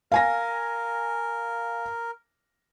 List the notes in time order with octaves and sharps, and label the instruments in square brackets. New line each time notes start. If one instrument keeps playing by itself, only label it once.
[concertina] A#4 [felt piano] F5 G#5 A#6